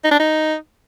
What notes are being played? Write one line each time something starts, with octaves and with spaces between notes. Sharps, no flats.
D#4
D4
D#4